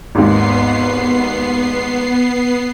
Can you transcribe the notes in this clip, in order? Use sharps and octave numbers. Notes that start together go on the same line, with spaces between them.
G#1 D#2 G#2 B3 C7